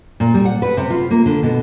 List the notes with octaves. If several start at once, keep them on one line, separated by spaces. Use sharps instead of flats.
A#2
G3
F#5
B4
C3
F4
A#3
D3
B2